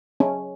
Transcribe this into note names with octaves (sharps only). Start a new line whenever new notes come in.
C#4